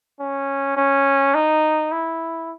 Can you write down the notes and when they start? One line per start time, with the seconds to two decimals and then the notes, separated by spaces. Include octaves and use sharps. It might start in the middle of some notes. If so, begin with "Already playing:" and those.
0.20 C#4
0.77 C#4
1.34 D#4
1.92 E4